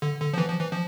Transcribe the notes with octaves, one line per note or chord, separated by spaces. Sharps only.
D3
D3
F3
E3
F3
E3
F3